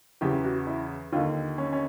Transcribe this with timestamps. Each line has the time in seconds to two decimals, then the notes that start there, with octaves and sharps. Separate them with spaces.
0.21 E2 C#3 E3 G4
0.44 F#4
0.67 E4
1.12 D#2 D3 F4
1.58 C#4
1.73 C#4